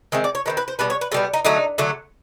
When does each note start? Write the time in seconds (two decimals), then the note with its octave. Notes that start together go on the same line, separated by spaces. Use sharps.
0.12 D#3 G#3 C4 E5
0.24 D5
0.35 C#5
0.46 D#3 G#3 C4 B4
0.57 B4
0.68 C5
0.79 B2 G3 B3 B4
0.90 C#5
1.01 B4
1.12 B2 G3 B3 A4
1.34 D#4
1.45 D3 F#3 A3 D#4
1.78 D3 F#3 A3